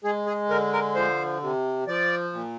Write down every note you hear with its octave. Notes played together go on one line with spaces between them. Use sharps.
G#3 G#4
G#4
D3 A#4
A#4
F3 C5
C3
F3 D5
A#2